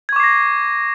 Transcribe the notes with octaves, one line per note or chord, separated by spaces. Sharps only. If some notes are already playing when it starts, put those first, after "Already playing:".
C#6 D6 G#6 A#6 C7